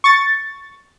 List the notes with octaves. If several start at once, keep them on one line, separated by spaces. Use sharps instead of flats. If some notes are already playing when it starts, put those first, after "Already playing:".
C#6 A6